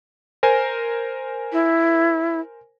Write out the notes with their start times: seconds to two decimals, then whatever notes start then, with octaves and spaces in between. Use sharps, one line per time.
0.43 A#4 C5 G#5
1.52 E4